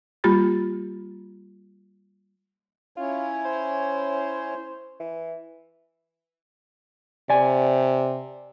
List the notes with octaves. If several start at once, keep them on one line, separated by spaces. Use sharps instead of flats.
G3 A#3 F4 G4 B5 A6
C#4 E4 F4 C#5
C5
E3
C3 D5 G#5